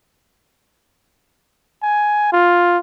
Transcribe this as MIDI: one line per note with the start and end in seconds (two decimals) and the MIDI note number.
1.82 2.29 80
2.32 2.78 65